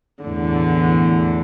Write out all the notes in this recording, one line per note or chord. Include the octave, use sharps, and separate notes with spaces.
E2 A2 D3